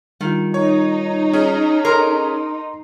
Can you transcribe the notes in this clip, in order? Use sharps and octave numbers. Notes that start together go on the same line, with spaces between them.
D#3 G3 F4
D#4 C#5
C#4 G#4
A#4 A#5 C6 C7